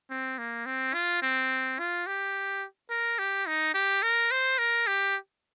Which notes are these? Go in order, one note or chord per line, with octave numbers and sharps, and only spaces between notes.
C4
A#3
C4
F4
C4
F4
G4
A#4
G4
D#4
G4
A#4
C5
A#4
G4